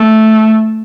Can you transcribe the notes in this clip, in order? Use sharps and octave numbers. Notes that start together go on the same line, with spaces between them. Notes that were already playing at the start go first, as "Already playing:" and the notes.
Already playing: A3